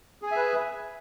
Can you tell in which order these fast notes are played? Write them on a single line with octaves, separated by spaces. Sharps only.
G#4 G#5 E5 B4